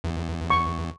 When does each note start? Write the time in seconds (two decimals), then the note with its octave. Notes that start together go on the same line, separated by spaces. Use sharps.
0.04 E2
0.50 C#6